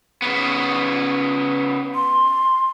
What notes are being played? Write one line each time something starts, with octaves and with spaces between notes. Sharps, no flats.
C#3 B3
C6